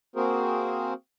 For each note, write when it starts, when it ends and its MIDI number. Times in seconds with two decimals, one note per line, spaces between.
0.16 0.94 58
0.16 0.94 60
0.16 0.94 66
0.16 0.94 68
0.16 0.94 70
0.16 0.94 72